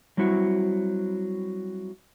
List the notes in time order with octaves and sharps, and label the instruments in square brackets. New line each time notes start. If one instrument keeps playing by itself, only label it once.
[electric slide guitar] F#3 G3 C4 E4 F#4